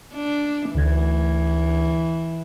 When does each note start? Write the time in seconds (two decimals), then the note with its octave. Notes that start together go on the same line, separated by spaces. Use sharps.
0.14 D4
0.75 D2 D3 E3 G#6